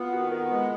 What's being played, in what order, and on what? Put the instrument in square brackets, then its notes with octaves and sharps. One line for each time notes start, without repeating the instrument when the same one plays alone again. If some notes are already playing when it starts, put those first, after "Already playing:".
Already playing: [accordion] B3 [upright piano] F4
[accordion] D#3 [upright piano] F#4
[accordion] B3 [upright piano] A#4
[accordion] G#3 [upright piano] B4